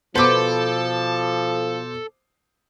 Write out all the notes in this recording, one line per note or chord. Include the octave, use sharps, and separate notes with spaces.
B2 F3 B3 A4 C5 D6